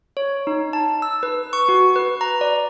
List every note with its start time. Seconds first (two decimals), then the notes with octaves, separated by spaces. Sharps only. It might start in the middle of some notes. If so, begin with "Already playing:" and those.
0.17 C#5
0.47 D#4
0.73 A5
1.02 E6
1.23 B4
1.53 C#6
1.69 F#4
1.96 B4
2.21 A#5
2.41 D5